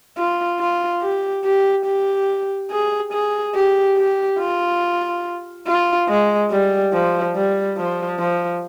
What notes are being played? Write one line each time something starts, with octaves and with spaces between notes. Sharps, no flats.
F4
F4
G4
G4
G4
G#4
G#4
G4
G4
F4
F4
G#3
G3
F3
G3
F3
F3